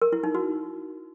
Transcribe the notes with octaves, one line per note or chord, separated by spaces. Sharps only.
A#4
E4
D#4
F#4